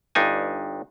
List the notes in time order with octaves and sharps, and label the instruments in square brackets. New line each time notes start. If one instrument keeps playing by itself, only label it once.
[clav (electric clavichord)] G1 G2 D4 D#4 G#5